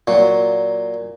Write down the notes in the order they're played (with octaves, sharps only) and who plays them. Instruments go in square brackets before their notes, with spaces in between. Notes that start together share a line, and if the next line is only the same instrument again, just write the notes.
[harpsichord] A#2 F#3